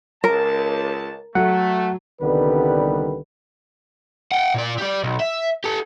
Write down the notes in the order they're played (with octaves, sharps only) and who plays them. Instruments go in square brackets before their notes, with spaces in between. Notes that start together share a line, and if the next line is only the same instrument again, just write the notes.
[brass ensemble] C#2 A5 [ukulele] A#4
[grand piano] F#3 [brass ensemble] A3 [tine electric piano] F#5
[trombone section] C2 D3 D#3 G3 B3 B4
[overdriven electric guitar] F#5 G5
A#2 D5
G4 D5
B1
E5
G4 A4